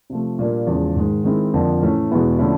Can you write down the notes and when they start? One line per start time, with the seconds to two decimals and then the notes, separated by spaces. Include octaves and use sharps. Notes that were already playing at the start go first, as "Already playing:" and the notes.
0.10 C3 F3 A3
0.39 A#2 G3 A#3 D4
0.67 E2 C#3 F3 G#3
0.96 G#2 D#3 G#3
1.24 D#3 G#3 C4 E4
1.54 F2 D3 F3 A#3
1.81 A2 E3 A3 C#4
2.11 E2 B2 G#3 B3 E4
2.38 D3 F3 A3 C#4 E4